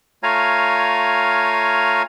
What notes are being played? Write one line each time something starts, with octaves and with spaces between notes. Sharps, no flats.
A3 F4 C#5 F5 G#5 A#5